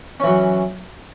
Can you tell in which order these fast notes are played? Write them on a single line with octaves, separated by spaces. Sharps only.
C#4 E3 F#3